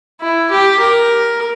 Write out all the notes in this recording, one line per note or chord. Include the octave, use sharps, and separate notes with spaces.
E4
G4
A#4